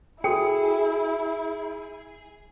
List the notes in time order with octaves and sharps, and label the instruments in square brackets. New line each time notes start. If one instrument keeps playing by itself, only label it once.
[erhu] E4 [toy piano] F#4 A4 G5 [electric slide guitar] G#4